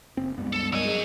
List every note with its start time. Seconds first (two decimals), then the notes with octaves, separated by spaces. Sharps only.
0.17 F#1 C4
0.38 C#2 G2 G3 G#3 B3
0.53 A4
0.73 F#3 A#4 D#5 G#5 E6
0.85 G#4 D#5